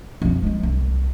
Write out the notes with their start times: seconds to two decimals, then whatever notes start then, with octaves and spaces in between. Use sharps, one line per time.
0.22 F2 C4
0.43 F3 G#3
0.63 C2